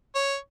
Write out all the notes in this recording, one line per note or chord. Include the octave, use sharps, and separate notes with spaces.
C#5